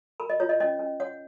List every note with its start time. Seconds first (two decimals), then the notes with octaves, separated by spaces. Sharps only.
0.20 A#4 B5
0.30 D#5
0.40 F4 C#5
0.49 D#5
0.60 C#4 D#5
0.79 C#4
1.00 C#5 F#5